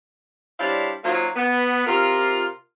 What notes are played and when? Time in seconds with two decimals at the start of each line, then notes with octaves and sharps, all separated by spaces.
0.60 G3 D4 E4 C5 C#5 F5
1.03 F#3 A#3 D#4 F4 F#4 C5
1.36 B3
1.87 C3 F4 A#4